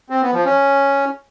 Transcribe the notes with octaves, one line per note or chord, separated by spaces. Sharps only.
C4
B3
F3
C#4